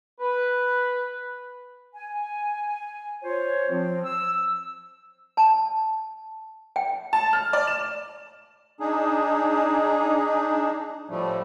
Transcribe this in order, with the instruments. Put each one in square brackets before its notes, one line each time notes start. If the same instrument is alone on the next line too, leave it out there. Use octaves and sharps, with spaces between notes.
[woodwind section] B4
G#5
F4 C5 C#5
F3 C4
E6
[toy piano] A5
G5
[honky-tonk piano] A5
F6
D5
E7
[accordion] D4 D#4 G#4
A2 F3 G3 A3